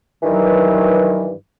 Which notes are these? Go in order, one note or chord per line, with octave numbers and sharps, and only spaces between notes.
G2 D#3 E3 F#3